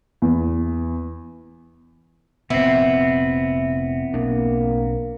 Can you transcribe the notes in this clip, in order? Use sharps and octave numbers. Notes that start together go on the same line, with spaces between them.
E2
F1 A#2 B3 C4 E4
B1 B2 A#3 D4